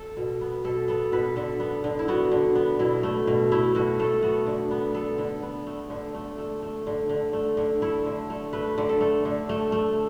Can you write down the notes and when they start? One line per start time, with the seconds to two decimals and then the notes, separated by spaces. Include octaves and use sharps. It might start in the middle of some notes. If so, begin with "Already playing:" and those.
Already playing: A4
0.17 B2
0.41 B3
0.64 B2 A4
0.88 B3 A4
1.12 B2 B4
1.36 D3 A4
1.60 B3
1.84 D3
1.99 E4
2.08 B3 F#4
2.32 D3
2.55 B3
2.79 B2 E4
3.03 A3
3.27 B2
3.52 A3 E4
3.75 B2 F#4
3.99 A3 A4
4.23 B3 F#4
4.47 D3
4.71 B3
4.94 B3 A4
5.18 D3
5.43 B3
5.66 A3
5.90 D3
6.14 A3
6.38 A3
6.62 A3
6.87 D3
7.09 D3
7.33 A3
7.57 D3
7.82 A3 E4
8.06 D3
8.30 A3
8.53 A3 B4
8.78 D3
8.89 A4
9.01 A3
9.25 D3
9.49 A3
9.72 A3